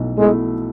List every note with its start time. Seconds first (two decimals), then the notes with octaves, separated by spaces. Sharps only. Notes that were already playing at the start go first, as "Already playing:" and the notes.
Already playing: B1 B2 A3 E4
0.18 B2 G#3 A3 E4